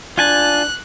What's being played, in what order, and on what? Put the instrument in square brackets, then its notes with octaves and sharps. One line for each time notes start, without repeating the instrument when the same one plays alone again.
[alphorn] D4 [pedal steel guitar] F4 G#5 A5 [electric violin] F#6